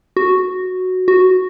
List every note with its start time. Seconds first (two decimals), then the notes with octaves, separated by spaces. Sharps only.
0.17 F#4
1.08 F#4